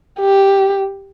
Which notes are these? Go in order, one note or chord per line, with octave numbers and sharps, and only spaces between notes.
G4